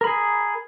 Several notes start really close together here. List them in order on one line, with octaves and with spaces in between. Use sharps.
A#4 B5 G#4